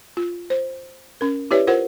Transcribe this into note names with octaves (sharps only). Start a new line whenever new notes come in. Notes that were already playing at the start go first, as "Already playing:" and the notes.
F4
C5
C#4 A#4
E4 G4 B4 C#5 D5 E5
F4 A#4 C5 F#5